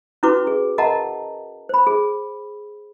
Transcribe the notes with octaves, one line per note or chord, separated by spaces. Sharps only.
C#4 E4 F#4 B4 C#6 D6
G#4
A#4 D#5 F5 F#5 A5 A#5
C5 B5
G#4